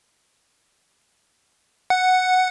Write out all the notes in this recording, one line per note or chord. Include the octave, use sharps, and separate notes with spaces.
F#5